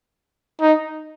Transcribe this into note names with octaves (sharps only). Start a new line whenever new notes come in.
D#4